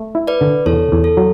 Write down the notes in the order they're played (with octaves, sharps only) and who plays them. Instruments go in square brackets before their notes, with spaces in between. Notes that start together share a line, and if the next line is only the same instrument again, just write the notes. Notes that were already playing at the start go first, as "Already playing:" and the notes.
Already playing: [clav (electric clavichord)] A3
E4
[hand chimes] B4 D5
[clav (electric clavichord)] D3
[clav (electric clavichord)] E2 [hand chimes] A4 C#5
[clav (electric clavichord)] E2
[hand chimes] A4
[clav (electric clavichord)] F#3